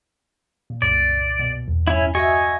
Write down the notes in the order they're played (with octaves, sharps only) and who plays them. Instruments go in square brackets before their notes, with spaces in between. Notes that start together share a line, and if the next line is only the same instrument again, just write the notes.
[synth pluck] A#2
[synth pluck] C2 F#2 A#2 [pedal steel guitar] D5
[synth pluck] B2
E2
[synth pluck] G2 [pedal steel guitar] C#4 E4
[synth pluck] F#4 E5 [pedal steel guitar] D#5 G#5 C#6